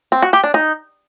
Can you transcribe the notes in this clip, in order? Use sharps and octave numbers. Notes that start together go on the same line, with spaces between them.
C4
F#4
G4
D4
D#4